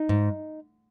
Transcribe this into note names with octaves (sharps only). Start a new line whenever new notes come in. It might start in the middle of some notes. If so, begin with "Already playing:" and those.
Already playing: D#4
G#2